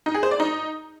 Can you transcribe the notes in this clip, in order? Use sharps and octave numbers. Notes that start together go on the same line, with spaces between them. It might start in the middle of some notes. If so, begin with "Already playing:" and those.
D#4
G#4
C5
D5
D#4